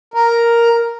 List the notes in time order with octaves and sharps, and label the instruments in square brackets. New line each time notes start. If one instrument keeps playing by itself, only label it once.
[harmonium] A#4